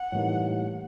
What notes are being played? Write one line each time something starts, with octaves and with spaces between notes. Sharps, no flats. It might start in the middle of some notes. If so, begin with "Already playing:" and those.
Already playing: F#5
A2 E3 G3 A#3 D#4